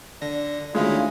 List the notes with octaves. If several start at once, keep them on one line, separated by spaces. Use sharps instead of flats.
D3 D5 A#6
D2 D#3 G#3 C#4 E4 F4